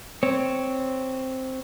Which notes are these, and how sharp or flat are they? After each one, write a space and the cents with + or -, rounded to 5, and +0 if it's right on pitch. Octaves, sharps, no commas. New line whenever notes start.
C4 +0 C#5 +0